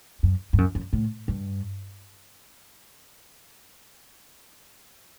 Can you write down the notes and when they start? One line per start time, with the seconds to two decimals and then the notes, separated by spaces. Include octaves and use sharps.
0.23 F#2
0.53 G2
0.58 F#2
0.75 F#2
0.93 A2
1.28 G2